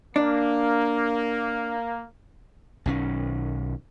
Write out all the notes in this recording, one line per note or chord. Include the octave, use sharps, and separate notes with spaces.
A#3 D4
B1 D#3 C#4